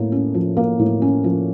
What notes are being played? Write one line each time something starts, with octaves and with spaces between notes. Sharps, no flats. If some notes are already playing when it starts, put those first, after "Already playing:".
Already playing: A2 A#3
C#4
F3
A#3
A2
C#4
F3